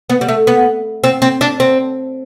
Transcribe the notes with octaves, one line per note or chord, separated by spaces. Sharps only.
B3
G3
A3
B3
C4
C4
D4
C4